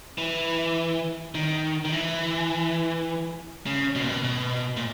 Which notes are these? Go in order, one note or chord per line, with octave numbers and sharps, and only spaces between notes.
E3
D#3
D#3
E3
C#3
B2
A#2
B2
B2
A#2